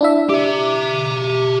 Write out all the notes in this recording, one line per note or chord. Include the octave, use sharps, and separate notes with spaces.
D4 E4 E5
G4 E5 D6